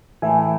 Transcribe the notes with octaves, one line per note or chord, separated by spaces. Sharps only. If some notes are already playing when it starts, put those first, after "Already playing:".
A2 E3 A3 E5 G#5